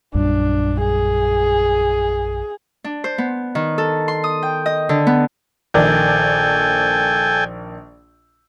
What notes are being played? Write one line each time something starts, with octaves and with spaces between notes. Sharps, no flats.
A#1 F#2 G3 D4
G#4
D4
C5
B3
D#3
A4
C6
D#6
G5
D#5
D3
B3
A#1 D#3 A4 D5 G5 G#5